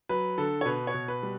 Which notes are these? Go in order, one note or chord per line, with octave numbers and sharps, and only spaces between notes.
F#3 B4
D3 A4
C#5
B2 B4
C#5
B2
B4
G3